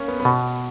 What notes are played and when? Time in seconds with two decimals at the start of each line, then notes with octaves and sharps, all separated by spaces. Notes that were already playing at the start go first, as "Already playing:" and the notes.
Already playing: A#3 C#4
0.08 B3
0.20 B3
0.25 B2